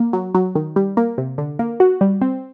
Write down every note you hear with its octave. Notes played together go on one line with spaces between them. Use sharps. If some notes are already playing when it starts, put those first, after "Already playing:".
Already playing: A#3
F#3
F#3
D#3
G3
A#3
C3
D3
A#3
F#4
G3
C4